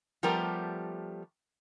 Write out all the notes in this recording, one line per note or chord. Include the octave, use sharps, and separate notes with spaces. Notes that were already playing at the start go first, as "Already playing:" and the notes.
F3 G3 A3 B3 G4 A#4